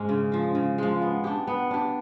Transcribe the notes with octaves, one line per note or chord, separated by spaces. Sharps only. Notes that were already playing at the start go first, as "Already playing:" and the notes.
Already playing: G#2 G#3 C#4
C#3
F3 G#3
C#3
F3 G#3
B3
D4 G4
B3
D4 G4